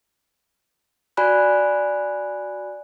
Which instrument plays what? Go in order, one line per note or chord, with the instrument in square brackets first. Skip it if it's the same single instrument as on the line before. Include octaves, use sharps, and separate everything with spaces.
[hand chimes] F#4 D5 G#5 B5 F#6